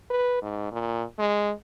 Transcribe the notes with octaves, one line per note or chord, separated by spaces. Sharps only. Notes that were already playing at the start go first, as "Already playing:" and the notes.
B4
G#2
A#2
G#3